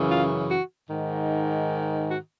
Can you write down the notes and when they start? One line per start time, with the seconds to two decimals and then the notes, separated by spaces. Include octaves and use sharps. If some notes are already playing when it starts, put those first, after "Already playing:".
Already playing: F#2 C#3 E3
0.09 F4
0.50 F#4
0.90 G#2 D#3
2.09 F#4